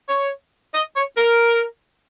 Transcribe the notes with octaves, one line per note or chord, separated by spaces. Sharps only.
C#5
D#5
C#5
A#4